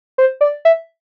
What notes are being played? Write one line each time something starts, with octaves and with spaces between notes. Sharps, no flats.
C5
D5
E5